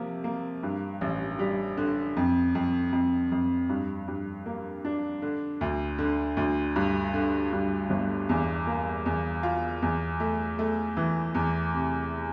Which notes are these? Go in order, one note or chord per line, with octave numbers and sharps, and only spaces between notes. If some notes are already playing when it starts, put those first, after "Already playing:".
Already playing: C3 F3 A#3
A#3
G2
A1
G3
D3
F2
F2
F2
F2
G2
G2
A#3
D4
D3
D2
D3
D2
G2
D3
G2
G1
E2
A#3
E2
F4
E2
A3
A3
E3
E2
C3